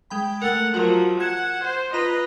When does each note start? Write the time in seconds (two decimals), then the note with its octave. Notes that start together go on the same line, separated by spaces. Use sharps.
0.10 G#3 G5 B5
0.42 A3 A#4 F#5
0.74 F3 F#3 F#4 A#4
1.20 F#5 F#6 G#6 E7
1.64 C5
1.93 F4 B4 D#5 A#5